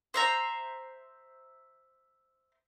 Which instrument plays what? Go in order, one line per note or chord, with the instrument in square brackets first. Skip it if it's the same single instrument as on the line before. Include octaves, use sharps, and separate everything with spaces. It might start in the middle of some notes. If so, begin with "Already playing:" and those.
[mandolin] C5 E5 A#5